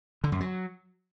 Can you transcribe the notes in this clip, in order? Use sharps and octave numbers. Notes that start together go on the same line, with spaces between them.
D3
F#2
F#3